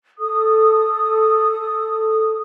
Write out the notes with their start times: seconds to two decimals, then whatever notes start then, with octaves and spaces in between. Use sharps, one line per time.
0.19 A4 D#6